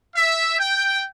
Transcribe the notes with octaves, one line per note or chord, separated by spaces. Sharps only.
E5
G5